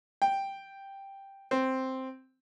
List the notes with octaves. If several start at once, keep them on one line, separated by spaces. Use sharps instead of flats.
G5
C4